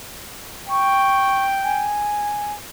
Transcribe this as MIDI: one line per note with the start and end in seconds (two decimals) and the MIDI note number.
0.69 1.95 79
0.69 1.42 85
1.64 2.53 80